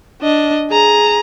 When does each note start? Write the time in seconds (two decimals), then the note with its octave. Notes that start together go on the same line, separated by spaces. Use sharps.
0.22 D4 D#5
0.71 G#4 A#5